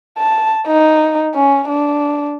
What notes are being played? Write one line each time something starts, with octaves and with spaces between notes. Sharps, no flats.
A5
D#4
C#4
D4